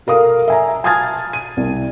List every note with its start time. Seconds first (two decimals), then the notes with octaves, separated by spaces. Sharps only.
0.07 A4 A#4 F5 D#6
0.48 E5 G#5 A#5
0.84 G#5 A5 D#6 F6 G#6 A6
1.33 D#7
1.57 C2